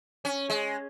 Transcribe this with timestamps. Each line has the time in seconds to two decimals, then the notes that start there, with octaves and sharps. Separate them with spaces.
0.25 C#4
0.50 G#3